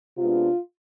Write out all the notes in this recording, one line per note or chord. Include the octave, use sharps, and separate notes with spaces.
C3 G#3 B3 D4 F4